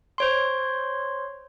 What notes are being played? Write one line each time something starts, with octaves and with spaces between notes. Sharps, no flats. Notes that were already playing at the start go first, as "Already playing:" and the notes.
C5 C#5 C6